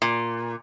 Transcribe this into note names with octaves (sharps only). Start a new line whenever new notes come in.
A#2